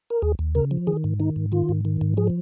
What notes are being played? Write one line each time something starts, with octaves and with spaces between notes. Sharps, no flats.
A#4
D#2 G#4
D#2
C#3 A#4
F3
D#3 G#4
G#2
D#3 D#4
G#2
D#3 F4
G#2
D#3
G#2
F3 G#4